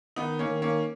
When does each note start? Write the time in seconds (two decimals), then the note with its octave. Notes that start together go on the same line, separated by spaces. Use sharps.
0.16 D#3 B3 D#4
0.39 A#3 C#4
0.47 D#3
0.62 A#3 C#4